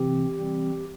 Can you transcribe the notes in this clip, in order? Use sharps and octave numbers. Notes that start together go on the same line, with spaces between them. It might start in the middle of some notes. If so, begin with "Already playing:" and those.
Already playing: C3 E3 C4 G4
E3 G3 C4